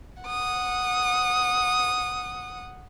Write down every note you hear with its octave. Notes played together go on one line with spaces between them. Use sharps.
F#5 D#6